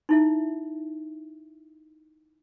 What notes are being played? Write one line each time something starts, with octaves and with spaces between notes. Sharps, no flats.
D#4 E4 E5